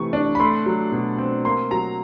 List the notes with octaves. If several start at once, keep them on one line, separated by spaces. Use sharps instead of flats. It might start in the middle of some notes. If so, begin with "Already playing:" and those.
Already playing: C3 E3 A3 C#6
D4
B5
A3 C6
F#3
B2
C4
A#3 C6
F#3 A#5